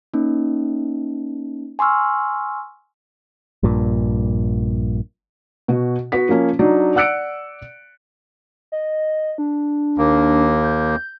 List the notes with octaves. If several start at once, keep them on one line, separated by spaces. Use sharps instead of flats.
A#3 C#4 D#4
G#5 C6 C#6 E6 F6
A#1 G2 A#2
B2 F#4
B3 F#4 B6
F3 A#3 C#4
F#3 D4 D#4
D5 F#5 E6 F#6 C#7 D7
D#5
D4
D#2 A#3
G6